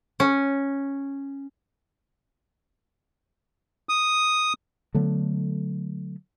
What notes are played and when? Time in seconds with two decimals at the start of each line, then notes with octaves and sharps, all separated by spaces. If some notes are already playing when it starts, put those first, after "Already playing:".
0.20 C#4
3.89 D#6
4.94 D3 F#3 A3 B3